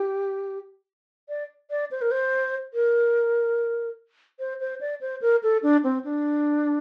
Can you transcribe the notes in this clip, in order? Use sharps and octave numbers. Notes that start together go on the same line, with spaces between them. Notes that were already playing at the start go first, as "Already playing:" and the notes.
Already playing: G4
D5
D5
C5
A#4
C5
A#4
C5
C5
D5
C5
A#4
A4
D4
C4
D4